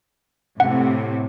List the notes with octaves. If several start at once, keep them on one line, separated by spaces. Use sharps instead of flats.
A2 C3 F#5